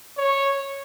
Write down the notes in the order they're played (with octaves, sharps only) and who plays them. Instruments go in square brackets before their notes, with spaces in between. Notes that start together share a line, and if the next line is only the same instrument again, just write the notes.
[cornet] C#5